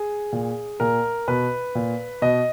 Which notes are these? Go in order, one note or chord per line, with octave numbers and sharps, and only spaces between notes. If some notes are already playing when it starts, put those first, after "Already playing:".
Already playing: G#4
A#2
A#2 A#4
B2 B4
A#2
B2 D#5